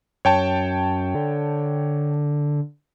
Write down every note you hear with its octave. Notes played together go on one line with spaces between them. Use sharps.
F#2 C#5 G5 A5
D3